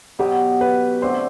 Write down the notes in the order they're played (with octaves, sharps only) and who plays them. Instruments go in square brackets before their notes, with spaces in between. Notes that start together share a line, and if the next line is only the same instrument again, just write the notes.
[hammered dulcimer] B2 F#3 B3 [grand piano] G4
[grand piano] B4
[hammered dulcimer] D3 A3 C4 G4 [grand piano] C5